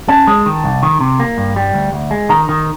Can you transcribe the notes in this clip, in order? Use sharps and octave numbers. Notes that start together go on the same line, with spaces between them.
C#4 A5
G#3
D#3
C2
D#3
C3
A#3
G2
G3
D2
D2
G#3
D#3 A#5
D#3